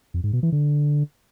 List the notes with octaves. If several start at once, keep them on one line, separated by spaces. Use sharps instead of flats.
F2
G#2
B2
E3
D3